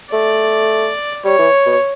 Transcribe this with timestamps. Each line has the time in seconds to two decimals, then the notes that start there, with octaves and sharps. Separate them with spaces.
0.12 A3 D5
1.25 G3 C#5
1.39 E3
1.66 B2